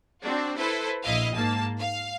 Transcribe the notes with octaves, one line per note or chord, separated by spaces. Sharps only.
C4 D4 F#4
E4 A4 B4 C5
A#1 E4 D#5 F5
G#2 A#3 A5
F5